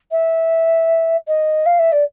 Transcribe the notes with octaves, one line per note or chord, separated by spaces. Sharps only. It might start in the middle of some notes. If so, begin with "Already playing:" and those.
E5
D#5
F5
E5
D5